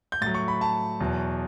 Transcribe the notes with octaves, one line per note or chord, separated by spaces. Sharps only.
G6
A2 A6
F#3
C#6
B5
A5
E2 B2 F#3